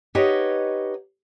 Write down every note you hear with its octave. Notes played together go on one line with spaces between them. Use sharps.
D#4 G4 B4 C#5 D#5 F#5